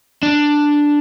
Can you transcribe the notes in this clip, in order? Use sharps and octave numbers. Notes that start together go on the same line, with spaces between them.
D4